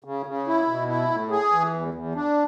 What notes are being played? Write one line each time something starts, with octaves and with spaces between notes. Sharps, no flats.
C#3
C#3
E4
B2
E4
A2
G#4
E3
E2
E2
D4